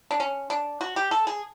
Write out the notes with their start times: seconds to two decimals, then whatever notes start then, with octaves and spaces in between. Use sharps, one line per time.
0.11 D4
0.20 C#4
0.50 D4
0.81 F#4
0.96 G4
1.11 A4
1.27 G#4